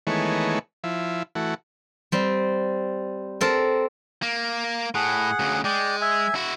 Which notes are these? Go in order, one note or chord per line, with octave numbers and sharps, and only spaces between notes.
D#3 E3 G#3 A3 B3 C#5
F3 E4
E3 A3 F#4
G3 C4
C4 A4 A#4
A#3
A2 G#4 F#5
D2 C#3
G#3 D5 G5
E5 G#5
E4 F#4